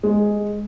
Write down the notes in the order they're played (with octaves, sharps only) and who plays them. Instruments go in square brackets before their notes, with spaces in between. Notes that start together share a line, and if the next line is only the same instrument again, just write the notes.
[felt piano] G#3